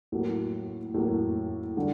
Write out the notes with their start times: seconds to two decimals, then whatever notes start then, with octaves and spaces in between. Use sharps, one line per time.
0.12 A2 F#3 A#3
0.94 A2 F#3 A#3
1.77 D3 G3